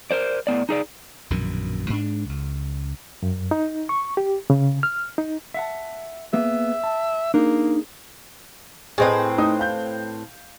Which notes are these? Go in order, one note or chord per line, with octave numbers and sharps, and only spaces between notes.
A#4 C5 D5
A2 B3 D5
D#4 G#4 D5
A#1 F#2 B2 D#3
G#2 D4
C#2
F#2
D#4
C#6
G4
C#3
F6
D#4
E5 F#5 A5
A#3 B3 G#4 E5
A5
A#3 D4 D#4 G#4
A2 C4 G#4 B4 D#5
A3 D#4 D#6
F5 G6